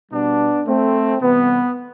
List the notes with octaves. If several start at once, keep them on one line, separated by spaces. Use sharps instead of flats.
B2 G3 B3 D4
A3 C4
C3 E3 G3 B3